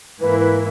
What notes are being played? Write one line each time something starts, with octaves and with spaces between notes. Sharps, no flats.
G#2 E3 A#3 E4 B4
B4